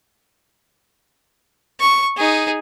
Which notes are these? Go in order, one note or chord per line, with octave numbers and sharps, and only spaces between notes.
C#6
D#4 G#4